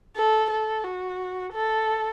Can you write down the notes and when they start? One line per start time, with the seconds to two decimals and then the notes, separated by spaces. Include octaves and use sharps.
0.16 A4
0.50 A4
0.84 F#4
1.53 A4